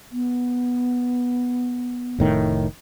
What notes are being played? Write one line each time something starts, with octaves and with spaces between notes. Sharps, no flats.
B3
F1 A2 D#3